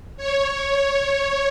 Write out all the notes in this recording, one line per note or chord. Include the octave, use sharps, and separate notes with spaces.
C#5